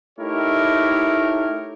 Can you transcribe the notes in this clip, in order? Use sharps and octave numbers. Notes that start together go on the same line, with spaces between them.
A3 D#4 E4 G4 A#4 C#5